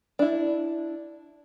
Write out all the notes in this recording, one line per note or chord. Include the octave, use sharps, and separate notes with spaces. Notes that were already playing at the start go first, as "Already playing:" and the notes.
D4 E4